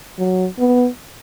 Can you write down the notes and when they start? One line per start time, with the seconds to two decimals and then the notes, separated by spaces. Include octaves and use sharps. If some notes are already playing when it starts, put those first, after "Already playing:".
0.18 F#3
0.59 B3